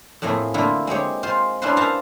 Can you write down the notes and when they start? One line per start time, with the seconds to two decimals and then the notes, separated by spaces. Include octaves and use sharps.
0.22 F2 A2 A3 A#3 G#4
0.54 D3 A3 A#3 E4 F4
0.87 G#3 C4 G4 C#5
1.23 F4 C5 G#5
1.62 C#4 D4 E4 F4 B4 C5
1.77 A#4 C5 E5 F5 A5 A#5